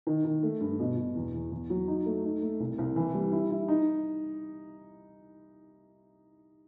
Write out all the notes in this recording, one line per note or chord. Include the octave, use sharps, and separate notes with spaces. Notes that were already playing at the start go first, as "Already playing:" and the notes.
D#3
D#3
A3
G2
B2
B2
E2
E2
E2
F#3
D#4
A3
D#4
A3
C2
C2
E3
G3
E4
E4
D#4